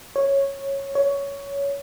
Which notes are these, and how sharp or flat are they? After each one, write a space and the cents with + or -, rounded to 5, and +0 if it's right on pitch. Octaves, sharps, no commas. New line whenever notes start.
C#5 -10
C#5 +15